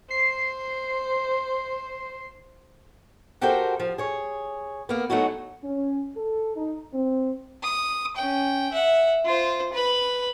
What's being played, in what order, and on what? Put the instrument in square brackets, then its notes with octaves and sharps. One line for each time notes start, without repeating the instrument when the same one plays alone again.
[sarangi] C5 [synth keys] C7
[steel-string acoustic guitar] F#4 G4 A4 A#4 C5 G5
F3
G#4 C#5
A#3 B3
F#3 A3 C#4 D#4 E4 F#4
[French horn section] C#4
A4
D#4
C4
[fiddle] D#6
C#4 G5
E5 F#5
F4 C5
B4 B5